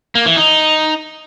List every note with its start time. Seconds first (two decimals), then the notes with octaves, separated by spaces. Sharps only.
0.15 A#3
0.26 E3
0.36 D#4